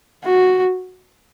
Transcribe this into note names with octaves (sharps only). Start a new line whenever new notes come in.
F#4